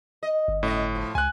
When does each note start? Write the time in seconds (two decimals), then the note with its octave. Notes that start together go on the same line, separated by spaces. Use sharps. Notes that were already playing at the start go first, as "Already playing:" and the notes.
0.23 D#5
0.48 G1
0.63 A2 C#4 D#5
0.95 F3
1.15 C#2 G#5 F#6